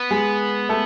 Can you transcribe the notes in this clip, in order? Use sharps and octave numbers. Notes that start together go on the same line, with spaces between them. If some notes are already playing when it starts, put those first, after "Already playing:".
Already playing: B3
G#3 G#4
A3 A4